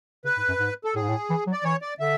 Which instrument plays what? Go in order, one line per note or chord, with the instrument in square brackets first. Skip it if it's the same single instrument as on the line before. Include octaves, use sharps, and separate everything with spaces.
[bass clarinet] C#3 [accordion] B4
[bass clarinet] G#2
F#2
G#2
[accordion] A4
[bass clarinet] A2 [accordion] G#4
[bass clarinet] G#2
A2
E3
F#3
[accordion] D5
[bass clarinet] E3 [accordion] C#5
[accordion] D5
[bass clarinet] D3 [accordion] E5